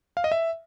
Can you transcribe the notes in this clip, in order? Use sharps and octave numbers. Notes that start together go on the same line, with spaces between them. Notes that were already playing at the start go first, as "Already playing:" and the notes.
F5
D#5
E5